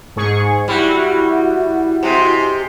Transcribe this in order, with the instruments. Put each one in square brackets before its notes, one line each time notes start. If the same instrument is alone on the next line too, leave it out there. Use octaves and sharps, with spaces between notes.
[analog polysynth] G#2 G#4 C#6
[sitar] G3 [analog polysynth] E4 F#4
[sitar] C3 G#3